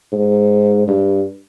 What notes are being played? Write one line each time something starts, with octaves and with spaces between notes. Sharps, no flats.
G#2
G2